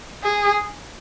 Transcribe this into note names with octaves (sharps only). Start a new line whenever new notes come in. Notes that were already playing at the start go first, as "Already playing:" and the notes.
G#4